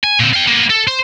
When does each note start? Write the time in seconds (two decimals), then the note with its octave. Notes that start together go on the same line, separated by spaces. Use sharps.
0.04 G#5
0.20 A#2 C4
0.33 F5 G5
0.47 A#3 B3
0.70 A4
0.87 C5